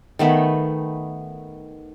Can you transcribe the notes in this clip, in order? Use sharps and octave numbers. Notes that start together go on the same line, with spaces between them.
D#3 A3 B3 B5